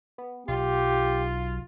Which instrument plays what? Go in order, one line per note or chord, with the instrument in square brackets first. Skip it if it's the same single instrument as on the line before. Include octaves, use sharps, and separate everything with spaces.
[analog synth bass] B3
[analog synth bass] B1 [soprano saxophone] F4 [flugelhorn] G4